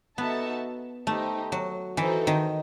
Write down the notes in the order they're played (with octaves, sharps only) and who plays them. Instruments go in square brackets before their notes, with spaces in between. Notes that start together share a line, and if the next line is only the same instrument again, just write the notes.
[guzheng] B3 [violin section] D#4 F#4 A4 E5 A5
[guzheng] A3 [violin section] D#4 G4 C5
[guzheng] F#3
[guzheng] E3 [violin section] D#4 F#4 A4 C5
[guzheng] D#3